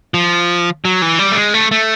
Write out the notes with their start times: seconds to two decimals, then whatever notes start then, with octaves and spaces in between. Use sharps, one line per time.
0.14 F3
0.85 F#3
1.02 E3
1.19 G3
1.31 A3
1.37 G#3
1.54 A3
1.71 A3